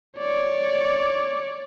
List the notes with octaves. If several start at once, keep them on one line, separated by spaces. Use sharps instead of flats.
C#5 D5